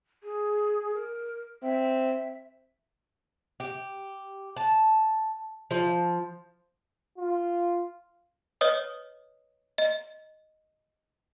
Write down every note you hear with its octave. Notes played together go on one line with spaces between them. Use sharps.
G#4
A#4
C4 E5
G4
A5
F3
F4
B4 C#5 D#5 D#6
D#5